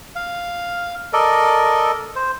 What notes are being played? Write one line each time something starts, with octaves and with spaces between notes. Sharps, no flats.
F5
A4 A#4 D5 D#5
C5